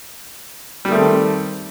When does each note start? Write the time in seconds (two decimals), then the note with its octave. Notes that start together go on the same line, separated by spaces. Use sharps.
0.85 G3
0.88 D#3
0.92 A3
0.95 C4